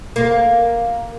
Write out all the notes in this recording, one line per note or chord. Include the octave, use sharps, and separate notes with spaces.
A#3